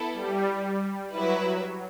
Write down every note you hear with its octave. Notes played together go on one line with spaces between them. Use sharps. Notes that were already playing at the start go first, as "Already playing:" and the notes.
Already playing: B3 E4 A4
G3
F#3 E4 B4 E5